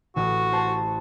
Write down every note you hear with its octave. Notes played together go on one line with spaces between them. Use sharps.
A1 F#4
C5 A5